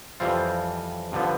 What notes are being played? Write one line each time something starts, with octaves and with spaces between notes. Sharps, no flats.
F2 E3 G3 C4 F4
G2 D3 F3 B3